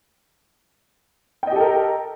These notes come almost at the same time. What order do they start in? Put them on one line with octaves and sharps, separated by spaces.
G5 D#5 G4 A4 A#4